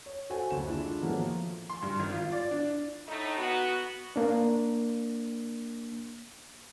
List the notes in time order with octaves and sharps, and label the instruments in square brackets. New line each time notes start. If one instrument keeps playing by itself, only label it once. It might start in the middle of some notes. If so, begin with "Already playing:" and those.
[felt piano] C#5
F#4 A4 C5 G#5
F#1 D2 E7
G#3 D4 E4 F4
A2 F3 F#3 G#3 A#3 B3
F3
[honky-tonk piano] C6
G2
G#1
F4
D5
D4
[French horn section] A2 A3 D#4
B3 F#4
[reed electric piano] A#3 D4